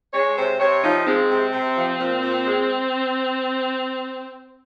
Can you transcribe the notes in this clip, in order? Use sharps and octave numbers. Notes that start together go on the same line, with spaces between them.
G#3 C#5
C3 C5
C3 C#5
F3 D#4
G#3 C4
C3
C3
F3
A#2
A#2
G#3